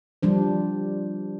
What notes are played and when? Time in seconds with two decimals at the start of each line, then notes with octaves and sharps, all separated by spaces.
0.23 F3 G3 D4 C5